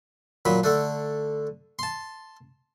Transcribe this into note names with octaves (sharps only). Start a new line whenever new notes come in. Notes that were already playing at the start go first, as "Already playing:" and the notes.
A#2 F#3 B5
D3 A3 D4
A5 C6